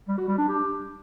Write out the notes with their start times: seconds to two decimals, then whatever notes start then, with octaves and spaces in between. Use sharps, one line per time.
0.08 G3
0.18 F#4
0.28 G3
0.38 D4
0.48 G4